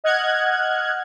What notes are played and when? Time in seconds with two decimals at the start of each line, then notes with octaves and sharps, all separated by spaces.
0.04 D#5 F#5 F6 F#6 G#6